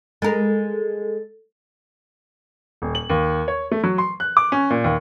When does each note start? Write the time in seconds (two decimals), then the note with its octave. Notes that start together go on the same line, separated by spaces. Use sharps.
0.22 G#3 A4 A#4
2.82 D#1
2.95 F#7
3.10 D#2
3.48 C#5
3.71 A3
3.84 F#3
3.98 C6
4.20 F#6
4.37 D6
4.52 C#4
4.70 A#2
4.84 D#2